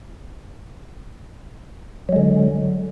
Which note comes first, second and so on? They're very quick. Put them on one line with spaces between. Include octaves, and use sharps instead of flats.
F#3 G#3 D3